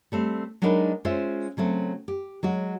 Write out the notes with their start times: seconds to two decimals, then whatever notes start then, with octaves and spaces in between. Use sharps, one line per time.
0.12 G3 A3 C4
0.62 F#3 G#3 D4 D#4 A#4 B4
1.05 G#3 C#4 F4 C5 E5
1.57 C#3 F#3 A3 C4
2.08 G4
2.43 F#3 G#3 F#4